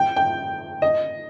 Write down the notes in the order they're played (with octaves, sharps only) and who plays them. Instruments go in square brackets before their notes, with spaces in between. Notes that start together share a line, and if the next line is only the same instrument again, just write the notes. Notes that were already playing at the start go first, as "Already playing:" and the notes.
Already playing: [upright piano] G5
G5
D#5